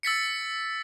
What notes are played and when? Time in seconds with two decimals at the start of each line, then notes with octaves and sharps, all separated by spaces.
0.03 E6 A6 B6 C#7